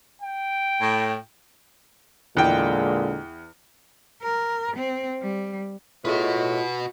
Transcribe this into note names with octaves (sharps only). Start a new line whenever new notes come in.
G5
A2
E2 A#2 D3 G#3 G5
A#4
C4
G3
A2 F4 F#4 G#4 B4 D#5